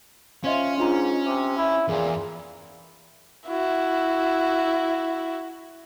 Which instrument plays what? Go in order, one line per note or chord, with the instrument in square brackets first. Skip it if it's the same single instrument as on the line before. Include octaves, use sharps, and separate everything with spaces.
[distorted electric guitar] C#4 [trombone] F4 [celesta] C5 D#5 E5
[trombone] G#2 [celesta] D4 F4 A#5
[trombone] C3 [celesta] D6
[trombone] E4
[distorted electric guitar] E2 [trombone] A#2 [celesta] G#4
[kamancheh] E4 F#4